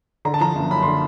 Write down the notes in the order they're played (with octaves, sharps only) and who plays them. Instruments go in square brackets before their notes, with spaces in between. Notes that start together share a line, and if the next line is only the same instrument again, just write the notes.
[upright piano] D3 A#5
A5
F3 A#5
F#1
F#2 B5
D3 C6